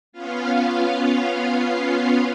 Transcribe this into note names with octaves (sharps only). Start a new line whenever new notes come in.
B3 C#4 F4 F5